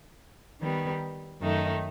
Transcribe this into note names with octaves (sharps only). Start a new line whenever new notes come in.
D#3 G3 B3
F#2 D#3 A3 D#4